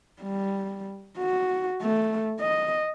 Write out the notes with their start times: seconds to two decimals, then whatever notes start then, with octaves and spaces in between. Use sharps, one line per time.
0.21 G3
1.18 F#4
1.82 A3
2.41 D#5